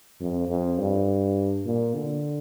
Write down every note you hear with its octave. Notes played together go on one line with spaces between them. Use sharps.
F2
F2
G2
A#2
D3